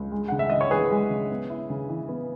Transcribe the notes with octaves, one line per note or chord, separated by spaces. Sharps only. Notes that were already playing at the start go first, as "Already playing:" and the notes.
Already playing: C#2
G#3
C#3 F#5
E5
C#3 D#5
C#5
E3 G#4 B4
G#3
C#3
B3
E4
C#3
E3
B3